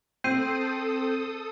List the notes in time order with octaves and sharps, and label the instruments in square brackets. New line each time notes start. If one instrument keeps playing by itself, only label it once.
[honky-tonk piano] C4 [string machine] A4 D#6 [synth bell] G6 C7 D#7